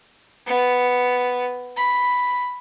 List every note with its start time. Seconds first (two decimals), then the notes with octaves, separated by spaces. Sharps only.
0.47 B3
1.77 B5